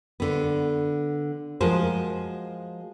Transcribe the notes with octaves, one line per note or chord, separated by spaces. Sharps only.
D3 B3
F3 G#3 F#4 A#4 C5